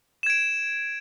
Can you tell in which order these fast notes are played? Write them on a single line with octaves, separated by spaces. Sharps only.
E7 G#6 D7